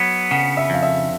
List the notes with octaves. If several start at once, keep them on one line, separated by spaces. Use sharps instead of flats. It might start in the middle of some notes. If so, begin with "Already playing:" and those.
Already playing: F#3 B3
C#3 F#5
E5
F2 F5
E5